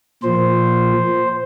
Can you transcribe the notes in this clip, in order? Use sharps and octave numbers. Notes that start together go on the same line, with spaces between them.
A#2 F3 C5